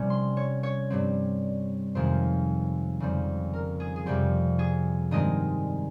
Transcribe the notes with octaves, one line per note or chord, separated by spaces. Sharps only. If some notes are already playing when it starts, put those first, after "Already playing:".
Already playing: C3 G3 C#4
C6
C#5
C#5
G2 G3 C4
F2 C3 D#3 G#3 C5
F2 C#3 G3 C4
A#4
G#4
G#4
F2 C3 G3 C4 G4
G#4
G2 D#3 G#3 C4 D#5